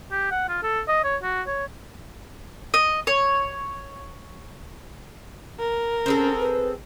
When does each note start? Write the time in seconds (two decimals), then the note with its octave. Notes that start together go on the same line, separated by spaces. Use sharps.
0.12 G4
0.31 F#5
0.49 F4
0.63 A4
0.88 D#5
1.04 C#5
1.23 F#4
1.47 C#5
2.74 D#5
3.07 C#5
5.59 A#4
6.06 C4 C#4 G#4 A4
6.39 B4